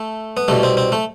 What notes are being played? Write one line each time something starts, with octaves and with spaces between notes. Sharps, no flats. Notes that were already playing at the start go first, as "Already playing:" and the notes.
Already playing: A3
B3
C2 B2 A3
C4
C4
A3